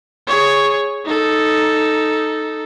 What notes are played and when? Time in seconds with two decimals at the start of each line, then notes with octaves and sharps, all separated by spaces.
0.27 G#4 C#5
1.06 D#4 A4